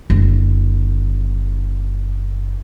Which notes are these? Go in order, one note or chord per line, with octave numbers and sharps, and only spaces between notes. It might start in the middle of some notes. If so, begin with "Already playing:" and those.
F#1 D3